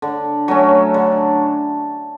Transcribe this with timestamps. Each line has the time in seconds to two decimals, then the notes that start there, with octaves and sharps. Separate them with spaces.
0.02 D3
0.48 F#3 A3 C#4
0.94 D3